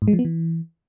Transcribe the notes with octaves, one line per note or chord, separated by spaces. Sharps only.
G#2
G#3
F3
B3
E3